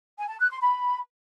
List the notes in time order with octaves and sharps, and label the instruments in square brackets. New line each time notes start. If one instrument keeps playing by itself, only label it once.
[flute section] G#5
A5
F#6
C6
B5